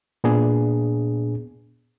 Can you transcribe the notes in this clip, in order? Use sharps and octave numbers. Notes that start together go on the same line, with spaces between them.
A#2 B3 D4 G#4